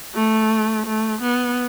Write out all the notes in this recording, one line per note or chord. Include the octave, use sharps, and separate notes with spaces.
A3
A3
B3